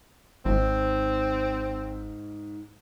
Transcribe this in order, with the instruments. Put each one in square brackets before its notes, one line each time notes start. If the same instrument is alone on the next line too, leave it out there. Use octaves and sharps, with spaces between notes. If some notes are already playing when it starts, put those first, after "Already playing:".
[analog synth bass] G#1 [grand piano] G#2 D#3 [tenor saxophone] C4